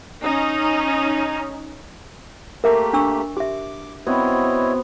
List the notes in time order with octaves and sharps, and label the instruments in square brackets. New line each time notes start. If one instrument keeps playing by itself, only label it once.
[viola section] C#4 D#4
[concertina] A3 A#3 G4 [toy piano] A#4 E5 D6
[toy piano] D4 C#6 E6
[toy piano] G4 E5 [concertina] D6
[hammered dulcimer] B3 C4 F#4 [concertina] E4 C#5 D#5